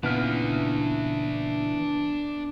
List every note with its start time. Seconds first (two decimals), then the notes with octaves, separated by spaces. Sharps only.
0.04 A#2 C#3 E3 B3 D4 F4 E5 F6